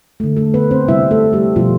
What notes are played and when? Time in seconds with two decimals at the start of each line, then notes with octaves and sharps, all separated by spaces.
0.20 D3 A3
0.37 A3 A4
0.54 B3 B4
0.71 C4 C5
0.88 C3 G3 E4 E5
1.11 A3 A4
1.33 G3 G4
1.56 B2 F3 G3 F4